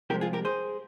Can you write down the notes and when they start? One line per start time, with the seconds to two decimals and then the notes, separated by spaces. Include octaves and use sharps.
0.10 C2 C3 F3 G#3 G4 A#4
0.21 F4 G#4
0.33 G4 A#4
0.45 G#4 C5